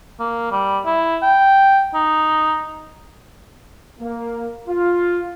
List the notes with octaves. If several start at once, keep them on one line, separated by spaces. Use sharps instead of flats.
A#3
G3
E4
G5
D#4
A#3
F4